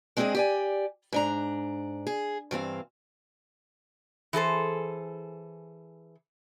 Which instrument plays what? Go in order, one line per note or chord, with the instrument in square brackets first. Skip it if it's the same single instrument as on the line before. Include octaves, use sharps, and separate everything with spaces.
[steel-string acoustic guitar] G#3 C4 D4 F#4 G#4 D#5
G4 D5 G#5
G#2 D4 A#5
G#4
G2 E3 C4 F5
[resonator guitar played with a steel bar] E3 G#4 A4 C5